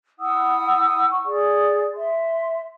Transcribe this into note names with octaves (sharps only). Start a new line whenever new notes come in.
E4 F#5 D#6 E6
C#6
G#4 D5
E5 C6